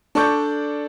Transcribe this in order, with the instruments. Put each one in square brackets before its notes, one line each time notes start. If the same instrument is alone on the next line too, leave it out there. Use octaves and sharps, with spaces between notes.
[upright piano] D4 A4 D5 C#6 G6